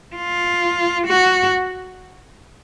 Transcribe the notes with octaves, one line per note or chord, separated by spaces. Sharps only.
F4
F#4